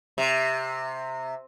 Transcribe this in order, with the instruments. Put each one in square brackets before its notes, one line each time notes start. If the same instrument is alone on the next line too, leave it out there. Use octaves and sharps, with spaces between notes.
[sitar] C3